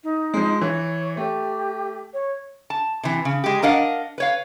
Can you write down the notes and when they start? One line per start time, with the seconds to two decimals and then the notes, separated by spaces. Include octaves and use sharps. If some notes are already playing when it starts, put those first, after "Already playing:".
0.03 D#4
0.34 F3 G#3
0.61 E3 C#5
1.17 A3 G4
2.13 C#5
2.70 A5
3.03 C3 E3
3.25 C#3
3.44 G#3 G4
3.62 D4 A#4 D#5 F5 F#5
4.18 B4 C#5 F5